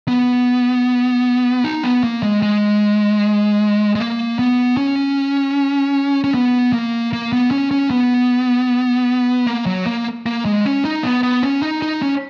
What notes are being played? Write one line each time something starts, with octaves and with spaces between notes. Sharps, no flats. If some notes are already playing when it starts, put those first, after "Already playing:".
B3
D#4
B3
A#3
G#3
G#3
G#3
A#3
B3
C#4
C#4
B3
A#3
A#3
B3
C#4
C#4
B3
A#3
F#3
A#3
A#3
G#3
C#4
D#4
B3
B3
C#4
D#4
D#4
C#4